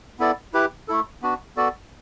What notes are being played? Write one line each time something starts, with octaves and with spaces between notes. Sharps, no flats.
B3 E4 A4 D5
E4 G4 B4
A3 E4 A4
B3 D4 F#4
B3 F#4 A4 D5